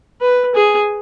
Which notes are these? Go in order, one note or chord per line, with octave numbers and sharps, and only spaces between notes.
B4
G#4